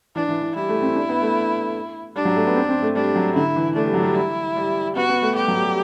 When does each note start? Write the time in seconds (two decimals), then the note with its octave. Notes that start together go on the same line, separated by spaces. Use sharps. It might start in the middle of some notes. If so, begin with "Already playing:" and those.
0.15 E3 D4
0.29 E3
0.42 E3
0.55 G3 E4
0.69 A3
0.82 C4
0.96 D4
1.09 B3
1.22 A3
2.16 G3 D4
2.25 F#3
2.36 A3
2.46 B3
2.56 C4
2.69 C4
2.82 A3
2.96 G3 D4
3.16 F#3
3.35 D3 E4
3.56 E3
3.76 A3 D4
3.85 G3
3.94 F#3
4.03 G3
4.15 E4
4.56 G3
4.96 B3 F#4
5.09 B3
5.22 A3
5.36 G3 G4
5.48 F#3
5.61 G3